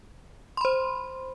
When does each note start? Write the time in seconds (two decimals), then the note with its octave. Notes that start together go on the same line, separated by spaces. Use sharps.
0.57 C6
0.61 B5
0.65 C5